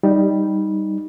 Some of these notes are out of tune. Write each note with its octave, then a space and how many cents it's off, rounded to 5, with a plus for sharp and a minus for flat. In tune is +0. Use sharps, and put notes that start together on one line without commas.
G3 +0 D#4 +0